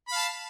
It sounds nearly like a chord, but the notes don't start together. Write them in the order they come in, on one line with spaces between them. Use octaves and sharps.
B5 F5 A5